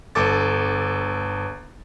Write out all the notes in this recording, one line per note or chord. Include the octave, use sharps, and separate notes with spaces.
G1 A4 D6 A6